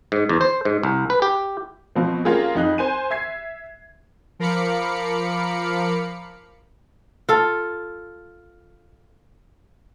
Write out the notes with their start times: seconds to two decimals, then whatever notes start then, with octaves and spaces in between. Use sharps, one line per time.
0.12 G#2
0.29 E2
0.41 C5
0.65 G#2
0.83 C2
1.10 B4
1.22 G4
1.95 B2 F3 C4
2.25 A#3 C#4 F4 G4 G#4
2.55 F2 D#4 F#6
2.78 C5 G#5 D#7
3.11 E5 G#6 C7
4.39 F3 A#4 F5 B5 D6 C#7
7.29 F4 A4